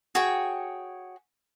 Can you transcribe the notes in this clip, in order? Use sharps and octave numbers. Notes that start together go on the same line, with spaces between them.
F#4 G#4 C#5 G5